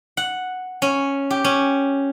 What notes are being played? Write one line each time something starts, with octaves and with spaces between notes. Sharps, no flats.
F#5
C#4
G4
C#4